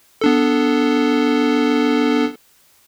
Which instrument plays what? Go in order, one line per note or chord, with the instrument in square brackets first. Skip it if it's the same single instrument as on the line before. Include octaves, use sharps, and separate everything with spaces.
[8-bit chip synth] B3 D4 A4